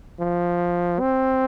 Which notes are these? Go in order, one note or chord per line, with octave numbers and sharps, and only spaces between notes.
F3
C4